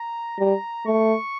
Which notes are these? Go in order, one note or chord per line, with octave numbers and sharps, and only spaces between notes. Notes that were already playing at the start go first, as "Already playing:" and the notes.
Already playing: A#5
G3 A#5
A3 C#6